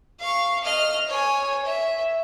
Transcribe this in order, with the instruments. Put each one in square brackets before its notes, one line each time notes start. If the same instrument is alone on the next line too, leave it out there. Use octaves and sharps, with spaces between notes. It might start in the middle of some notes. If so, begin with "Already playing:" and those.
[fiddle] F5 C#6
D#5 F6
C#5 G#5
E5